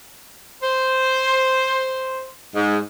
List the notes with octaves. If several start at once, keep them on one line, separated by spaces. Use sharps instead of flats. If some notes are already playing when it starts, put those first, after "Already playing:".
C5
G#2